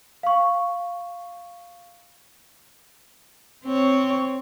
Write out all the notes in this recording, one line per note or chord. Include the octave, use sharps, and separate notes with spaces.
F5 C#6
C4 C#5